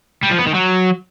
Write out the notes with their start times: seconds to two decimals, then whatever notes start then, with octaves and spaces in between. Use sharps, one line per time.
0.23 G3
0.31 F3
0.39 B3
0.47 D#3
0.55 F#3